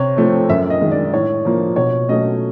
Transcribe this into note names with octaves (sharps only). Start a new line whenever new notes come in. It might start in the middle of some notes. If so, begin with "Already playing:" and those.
Already playing: C3 C#5
F3 A3 C4
F#2 E5
D#5
D#3 G#3
D5
A2 C#5
F3 A#3
B2 C#5
F#3 A3 C#4 D#5